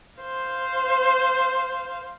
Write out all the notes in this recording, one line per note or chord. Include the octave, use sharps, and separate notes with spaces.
C5 F5